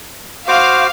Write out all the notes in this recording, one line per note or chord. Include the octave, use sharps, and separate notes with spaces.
F#4 C5 F5 D6